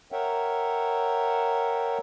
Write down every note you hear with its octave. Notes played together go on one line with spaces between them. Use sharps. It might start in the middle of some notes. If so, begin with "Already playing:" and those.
A#4 C#5 E5 F#5 G5